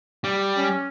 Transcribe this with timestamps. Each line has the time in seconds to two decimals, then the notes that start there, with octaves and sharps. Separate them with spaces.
0.24 G3
0.57 C#4